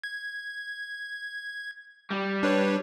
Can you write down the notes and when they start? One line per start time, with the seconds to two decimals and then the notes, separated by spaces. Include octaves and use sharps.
0.04 G#6
2.10 G3
2.43 D4 B4 C#5